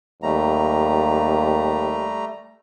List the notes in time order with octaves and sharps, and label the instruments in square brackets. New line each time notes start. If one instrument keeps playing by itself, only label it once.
[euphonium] D#2 [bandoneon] G3 A3 A#5